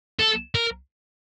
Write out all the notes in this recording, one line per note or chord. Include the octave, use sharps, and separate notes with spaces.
A4
A#4